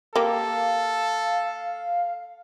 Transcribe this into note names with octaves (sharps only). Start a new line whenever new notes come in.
A#3 G4 A4 F5